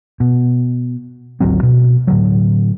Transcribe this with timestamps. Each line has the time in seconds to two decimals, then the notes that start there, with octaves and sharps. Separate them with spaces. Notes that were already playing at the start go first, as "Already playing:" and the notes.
0.20 B2
1.40 G#1 D2 F#3 C4
1.63 B2
2.07 A2 D3 F#3